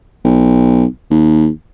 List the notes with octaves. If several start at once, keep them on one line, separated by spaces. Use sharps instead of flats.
B1
D#2